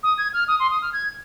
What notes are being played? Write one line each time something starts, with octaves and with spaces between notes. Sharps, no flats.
D#6
G#6
F6
D#6
C6
D#6
F6
G#6